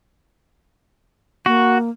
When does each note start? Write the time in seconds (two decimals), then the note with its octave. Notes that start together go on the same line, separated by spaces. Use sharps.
1.46 A#3 F#4